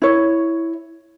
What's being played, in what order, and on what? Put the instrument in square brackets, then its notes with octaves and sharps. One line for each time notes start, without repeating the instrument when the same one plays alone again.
[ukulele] E4 C#5